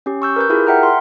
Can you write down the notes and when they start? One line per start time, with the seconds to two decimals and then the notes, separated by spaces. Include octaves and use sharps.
0.06 C#4 G4
0.22 C#6 E6 G6
0.36 A#4 B4 G6
0.50 E4 F4 G4 G#4 A#4
0.67 E5 F#5 G5 A#5 F6
0.83 C6